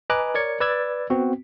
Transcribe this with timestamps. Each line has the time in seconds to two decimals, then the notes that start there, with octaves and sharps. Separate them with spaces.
0.10 B4 D#5 G#5 A#5 D6 F#6
0.34 A#4 C#5 D5 G#6 C#7
0.60 B4 D5 E6 G#6 A6
1.10 B3 C4 F#4